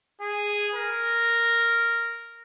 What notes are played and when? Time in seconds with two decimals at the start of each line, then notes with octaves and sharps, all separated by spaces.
0.21 G#4
0.74 A#4